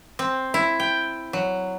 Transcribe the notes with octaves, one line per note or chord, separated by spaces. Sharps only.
C4
E4
G5
F#3